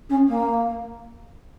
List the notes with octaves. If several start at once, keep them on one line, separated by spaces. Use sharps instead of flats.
C#4
A#3